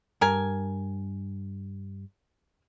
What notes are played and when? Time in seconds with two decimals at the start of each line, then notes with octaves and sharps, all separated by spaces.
0.21 G2 A#4 G#5